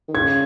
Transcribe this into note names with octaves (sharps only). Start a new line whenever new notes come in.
D#3
C#3 G#6